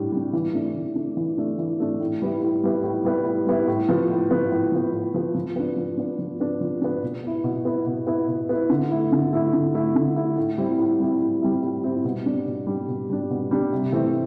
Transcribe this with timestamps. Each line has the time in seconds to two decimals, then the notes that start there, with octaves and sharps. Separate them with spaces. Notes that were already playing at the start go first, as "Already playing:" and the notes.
Already playing: A2 G3 D4
0.12 G3 D4
0.33 E3
0.53 A3 D4
0.74 E3
0.95 A3 D4
1.17 E3
1.38 A3 D4
1.58 E3
1.80 A3 D4
2.00 A2
2.22 G3 B3 E4
2.42 A2
2.64 G3 B3 E4
2.84 A2
3.04 G3 B3 E4
3.26 A2
3.47 G3 B3 E4
3.68 A2
3.89 F3 B3
4.10 A2
4.31 F3 B3
4.52 A2
4.72 F3 B3
4.93 A2
5.14 F3 B3
5.35 F3
5.56 B3 D4
5.76 F3
5.97 B3 D4
6.19 F3
6.40 B3 D4
6.61 F3
6.81 B3 D4
7.03 B2
7.23 B3 E4
7.44 B2
7.65 B3 E4
7.86 B2
8.07 B3 E4
8.28 B2
8.49 B3 E4
8.70 D3
8.91 A3 E4
9.12 D3
9.33 A3 E4
9.53 D3
9.74 A3 E4
9.95 D3
10.16 A3 E4
10.37 A2
10.58 G3 C4 E4
10.79 A2
11.00 G3 C4 E4
11.21 A2
11.42 G3 C4 E4
11.62 A2
11.84 G3 C4 E4
12.05 B2
12.26 G3 D4
12.46 B2
12.67 G3 D4
12.88 B2
13.10 G3 D4
13.30 B2
13.51 G3 D4
13.72 C3
13.92 E3 A3 C4